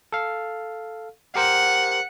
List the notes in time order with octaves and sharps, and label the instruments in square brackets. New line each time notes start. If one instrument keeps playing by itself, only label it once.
[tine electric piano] A4 F5
[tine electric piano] G4 A#4 C5 [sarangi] F#5